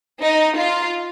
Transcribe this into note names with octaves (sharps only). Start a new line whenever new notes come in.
D#4
F4